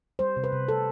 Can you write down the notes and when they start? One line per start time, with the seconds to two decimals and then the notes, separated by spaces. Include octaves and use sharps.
0.19 G3 C5
0.37 C3
0.44 B4
0.52 C3
0.68 C3 A4